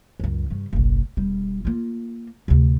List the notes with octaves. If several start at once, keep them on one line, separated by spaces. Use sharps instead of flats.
C#2 F#2
G2 C#3
F#1 B1
E1 G3
A#3 F4
D2 C3